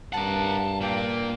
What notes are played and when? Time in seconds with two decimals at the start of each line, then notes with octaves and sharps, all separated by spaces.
0.13 G2 A#4 F#5 A5
0.81 A#2 A#3 G5